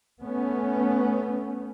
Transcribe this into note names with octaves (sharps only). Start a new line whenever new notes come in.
A3 B3 C#4